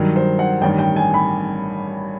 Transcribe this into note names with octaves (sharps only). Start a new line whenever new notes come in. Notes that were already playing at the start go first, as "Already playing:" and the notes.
Already playing: G2 D#3 F#3
C5
F#5
A1 G2 D#3 G5
G5
G#5
B5